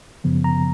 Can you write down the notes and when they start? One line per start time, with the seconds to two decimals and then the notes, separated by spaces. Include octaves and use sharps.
0.24 F#2 C#3 F3 B3
0.44 A#5